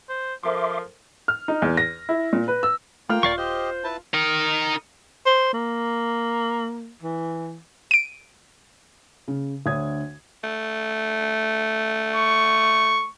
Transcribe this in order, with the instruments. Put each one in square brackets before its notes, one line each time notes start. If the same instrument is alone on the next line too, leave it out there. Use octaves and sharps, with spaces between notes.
[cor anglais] C5
[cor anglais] F3 [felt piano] A4 A#4 C5 [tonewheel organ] E5 C6 D6
[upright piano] F6
D#4
E2
A#6
E4
A#2
B4
E6
[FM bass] A3 [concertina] A#3 G5 [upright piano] F4 F6 F7
[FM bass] D#1 [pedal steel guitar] D5 F5 C#6
[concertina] G4 D#5 [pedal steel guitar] C5
[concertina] E4 B4 A5
[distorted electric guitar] D#4 A#4
[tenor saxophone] C5
A#3
E3
[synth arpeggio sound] D7 D#7
[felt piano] C#3
D2 D3 C#5 D#6 G#6
[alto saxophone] A3
[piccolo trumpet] C#6